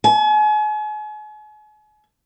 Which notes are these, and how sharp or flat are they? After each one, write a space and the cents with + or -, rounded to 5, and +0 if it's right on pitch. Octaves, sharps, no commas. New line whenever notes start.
G#5 +40